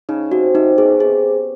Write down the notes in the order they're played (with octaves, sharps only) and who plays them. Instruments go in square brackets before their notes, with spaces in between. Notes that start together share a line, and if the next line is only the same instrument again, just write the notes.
[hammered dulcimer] C#3 [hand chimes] D#4
[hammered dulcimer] C3 [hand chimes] F#4
[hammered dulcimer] C3 [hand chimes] D#4
[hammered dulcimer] B2 [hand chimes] G#4
[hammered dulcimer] C3 [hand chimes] G#4